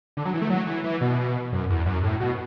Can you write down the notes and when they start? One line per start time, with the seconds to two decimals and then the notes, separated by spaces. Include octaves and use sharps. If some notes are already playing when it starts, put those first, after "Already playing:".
0.17 D3
0.25 F#3
0.34 E3
0.42 A3
0.50 F#3
0.67 E3
0.84 E3
1.01 B2
1.53 F#2
1.70 E2
1.86 F#2
2.03 A2
2.20 B2